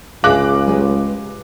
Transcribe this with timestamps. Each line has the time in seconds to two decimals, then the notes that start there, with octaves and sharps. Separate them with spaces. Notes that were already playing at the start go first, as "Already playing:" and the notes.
0.24 C#2 G#4 E5 F5 G#5 D6 F#6
0.67 G#3 G4 B4